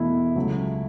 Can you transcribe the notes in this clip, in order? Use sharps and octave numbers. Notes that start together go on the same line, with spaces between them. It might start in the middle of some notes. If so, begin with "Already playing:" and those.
Already playing: E2 B2 A3 E4
C#2 C#3 F#3 A3